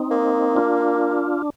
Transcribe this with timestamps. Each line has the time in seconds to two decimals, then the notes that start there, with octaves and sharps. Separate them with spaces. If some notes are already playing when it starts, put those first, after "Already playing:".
Already playing: C4 D#4
0.11 A#3
0.56 D4 F4